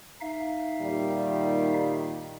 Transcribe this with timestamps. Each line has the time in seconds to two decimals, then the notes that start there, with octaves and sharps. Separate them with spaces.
0.21 D#4 E5 F5
0.81 A#2 D#3 G3